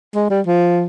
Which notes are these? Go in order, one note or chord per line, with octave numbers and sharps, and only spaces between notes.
G#3
G3
F3